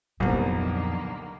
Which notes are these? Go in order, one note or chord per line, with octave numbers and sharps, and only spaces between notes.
C2 F2 A#2 D3 D#3 F#3 A#3 B3